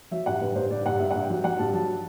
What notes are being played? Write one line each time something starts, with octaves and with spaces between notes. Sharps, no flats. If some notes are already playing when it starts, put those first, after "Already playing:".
F#3 E5
G2 F#5
G2 B4
G2 C5
G2 D5
G2 F#5
G2 E5
F#5
G2
G5
F#3
F#3 F#5
G2 A5
F#3 A5